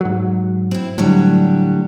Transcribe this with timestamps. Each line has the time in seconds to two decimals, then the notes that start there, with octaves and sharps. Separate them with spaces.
0.01 G#2 F#3
0.71 C4 E4
0.98 A2 D3 F#3 G3